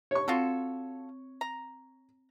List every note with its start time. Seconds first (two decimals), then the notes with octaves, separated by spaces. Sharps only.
0.11 C#5 C#6
0.28 C4 F4 F#4 A4
1.41 A#5